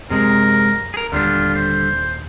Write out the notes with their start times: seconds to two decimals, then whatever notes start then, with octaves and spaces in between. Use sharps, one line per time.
0.10 F#2 C3 G#3 A#4
0.94 G#4 A#4
1.12 D#1 D#2 D3 G3 D4 F4
1.56 C5